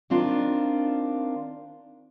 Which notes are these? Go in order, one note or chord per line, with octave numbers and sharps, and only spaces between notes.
D#3 C4 D4 F4